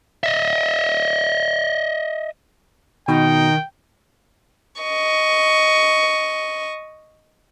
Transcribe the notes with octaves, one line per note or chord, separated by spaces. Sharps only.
D#5 E5
B2 D#3 D#4 G5
D#5 C#6